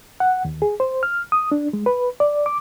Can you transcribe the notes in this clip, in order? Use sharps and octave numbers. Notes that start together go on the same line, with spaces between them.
F#5
D#2
G#4
C5
F6
D#6
D4
G#3
B4
D5
D6